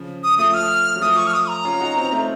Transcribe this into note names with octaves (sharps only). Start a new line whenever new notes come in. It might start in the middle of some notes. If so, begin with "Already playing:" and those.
Already playing: C#3 F3
D#6
F3 A3 D#6
F6
F#3
F3 A3 D#6
C#6
F6
D#6
A#5
C#4 F4
D#4 F#4
C4 D#4
A3 C4